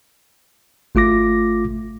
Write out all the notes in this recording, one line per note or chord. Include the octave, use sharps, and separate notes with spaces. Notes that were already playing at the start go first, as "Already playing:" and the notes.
G#1 A3 F4 D6 A#6